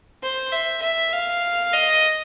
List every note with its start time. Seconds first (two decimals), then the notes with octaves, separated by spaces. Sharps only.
0.23 C5
0.52 E5
0.82 E5
1.13 F5
1.73 D#5